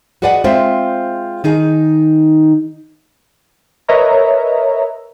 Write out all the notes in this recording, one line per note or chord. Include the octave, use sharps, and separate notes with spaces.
F#4 G#4 B4 D5 D#5 F#5
G#3 C4 F4 C5 E5 G5
D#3 D#4 G#4
A#4 B4 C#5 D#5 E5 A#5